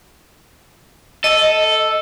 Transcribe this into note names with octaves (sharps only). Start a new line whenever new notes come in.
A4 D#5